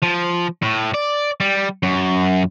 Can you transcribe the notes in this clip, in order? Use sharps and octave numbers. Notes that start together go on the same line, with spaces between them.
F3
A2
D5
G3
F#2